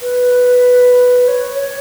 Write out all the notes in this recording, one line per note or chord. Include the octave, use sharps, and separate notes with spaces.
B4
C#5
C#5